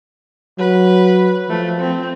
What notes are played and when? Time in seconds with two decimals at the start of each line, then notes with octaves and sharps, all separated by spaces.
0.59 F#3 B4
1.49 F3 A3
1.80 C4